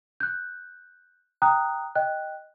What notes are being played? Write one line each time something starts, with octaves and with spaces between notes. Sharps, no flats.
F#6 G6
G5 A#5 D#6 F#6
D#5 G5 F#6